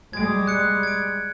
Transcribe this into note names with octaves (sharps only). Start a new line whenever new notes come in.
G3 G#3 G#6 D7
F#6 C#7
G#6 D7